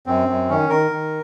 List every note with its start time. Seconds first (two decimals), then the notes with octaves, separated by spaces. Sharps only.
0.06 F#2 C4
0.28 F#2
0.49 D#3 C#4
0.69 D#3 A#4
0.91 D#3